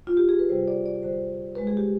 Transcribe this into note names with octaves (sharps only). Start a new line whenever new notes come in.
F4
G4
G#4
B4
C3 G3 C5
D5
D5
D3 G3 C5
D3 G#3 B4
G#4
G4